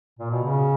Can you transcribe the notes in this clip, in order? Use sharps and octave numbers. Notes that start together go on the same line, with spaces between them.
A#2
B2
C#3